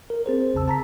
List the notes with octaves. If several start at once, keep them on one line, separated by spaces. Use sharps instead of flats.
A#4
C4 G#4 C5
A1 E2 C#3 A5 E6
A5 A#5 B6